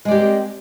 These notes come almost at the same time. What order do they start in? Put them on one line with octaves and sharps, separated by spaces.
G#3 D5 G4 A#3 C4